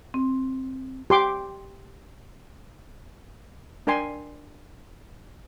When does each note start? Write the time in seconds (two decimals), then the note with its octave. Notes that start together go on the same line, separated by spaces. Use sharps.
0.14 C4
1.10 G4 C6 D6
3.87 D4 A#4 G5 G#5 C6